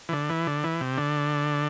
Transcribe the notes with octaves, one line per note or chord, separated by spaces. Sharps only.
E3
D3
E3
D3
E3
C3
D3